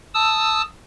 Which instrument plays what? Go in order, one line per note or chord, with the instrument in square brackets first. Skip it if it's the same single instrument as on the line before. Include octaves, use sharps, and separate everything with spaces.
[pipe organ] A5 D#6 E6